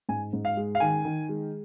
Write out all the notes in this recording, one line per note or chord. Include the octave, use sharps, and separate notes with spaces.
G#2 G#5
G#2
F5
G#3
F5
D#3 G#5
D#3
G#3